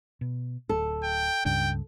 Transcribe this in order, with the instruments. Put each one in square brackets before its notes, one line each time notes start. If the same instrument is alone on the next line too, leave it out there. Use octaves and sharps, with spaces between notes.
[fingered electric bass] B2
[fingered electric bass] D1 [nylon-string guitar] A4
[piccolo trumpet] G5
[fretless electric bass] C#2 G2 C#3 [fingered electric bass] D4 [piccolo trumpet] G5